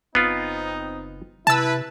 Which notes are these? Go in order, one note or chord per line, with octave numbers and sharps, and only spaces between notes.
F#1 B3 C4 D#4 F4
C3 E4 B4 A5 E6